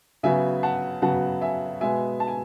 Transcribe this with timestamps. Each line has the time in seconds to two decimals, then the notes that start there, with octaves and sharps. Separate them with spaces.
0.23 C#3 F#3 B3 E5 G#5
0.63 F#5 A5
1.02 C#3 F#3 B3 F#5 A5
1.41 E5 G#5
1.81 B2 G#3 B3 E5 G#5
2.20 A5
2.28 G#5